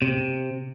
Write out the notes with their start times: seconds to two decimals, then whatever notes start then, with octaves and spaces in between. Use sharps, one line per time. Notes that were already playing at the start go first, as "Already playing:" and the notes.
0.02 C3